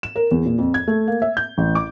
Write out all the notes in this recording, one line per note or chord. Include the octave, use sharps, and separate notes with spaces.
E7
A#4
E2
A#2
F2
G#6
A3
A#3
E5
G6
A1
D6